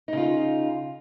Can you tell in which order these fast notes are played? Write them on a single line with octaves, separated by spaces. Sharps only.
D#4 C#3 F4